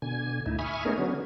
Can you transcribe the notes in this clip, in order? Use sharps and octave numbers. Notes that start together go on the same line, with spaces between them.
B2 D3 G#5
D2 A2 D#4 E4
E5 G#5 B5 C#6 D#6 F6
A3 B3 C#4 D#4 G#4 A#4
D3 F#3 B3 C#4